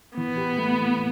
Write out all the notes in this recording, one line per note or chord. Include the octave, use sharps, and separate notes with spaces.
E3 B3
G4
A3
E3